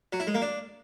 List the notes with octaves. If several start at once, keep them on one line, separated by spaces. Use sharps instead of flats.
F#3
E4
G#3
A#3
D4